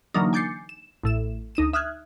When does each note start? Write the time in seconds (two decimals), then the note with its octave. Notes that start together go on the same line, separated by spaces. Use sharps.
0.14 D3 E3 F#3 A#3 D4 D#4
0.33 G#5 D6 G6 A6 C7 C#7
0.69 E7
1.04 A1 A2 E7
1.55 D2 D#4 D#7 E7
1.73 E5 D#6 F6 F#6 G#6